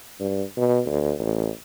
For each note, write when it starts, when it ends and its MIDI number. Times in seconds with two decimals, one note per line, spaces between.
0.20 0.43 43
0.57 0.80 47
0.86 1.13 38
1.19 1.49 33